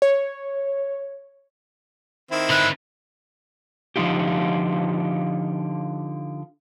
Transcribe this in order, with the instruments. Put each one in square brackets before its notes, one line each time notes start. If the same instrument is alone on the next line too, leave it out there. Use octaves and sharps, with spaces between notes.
[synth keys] C#5
[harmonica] D#3 C4 E4
[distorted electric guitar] D3 B4 [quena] F#6
[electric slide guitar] D3 F3 A#3 D#4 F4 G4